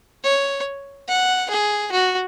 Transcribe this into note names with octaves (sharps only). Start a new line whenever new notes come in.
C#5
F#5
G#4
F#4